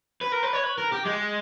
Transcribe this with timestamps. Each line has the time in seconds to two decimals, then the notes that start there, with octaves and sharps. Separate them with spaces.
0.21 B4
0.32 A#4
0.43 B4
0.53 C#5
0.64 B4
0.78 A#4
0.92 G4
1.05 G#3